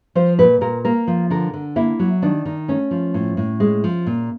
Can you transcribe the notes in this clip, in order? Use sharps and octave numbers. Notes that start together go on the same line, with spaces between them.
F3 C5
A#2 B4
A#2 A#4
A#3 A#4
F3
D3 A#4
D3
A#3 E4
F#3
D#3 D4
D#3
A3 C#4
F3
A2
A2
G#3
F3
A#2